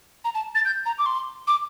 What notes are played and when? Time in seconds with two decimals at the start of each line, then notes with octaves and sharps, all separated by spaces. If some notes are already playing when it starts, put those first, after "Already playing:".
0.25 A#5
0.35 A5
0.55 A6
0.65 G6
0.86 A#5
0.99 D6
1.06 C6
1.47 D6